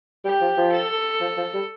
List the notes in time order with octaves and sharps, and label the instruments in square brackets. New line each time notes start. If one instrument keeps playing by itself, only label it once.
[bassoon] G3 [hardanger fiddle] G4
[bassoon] F3
F3
[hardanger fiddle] A4
[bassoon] F3
F3
G3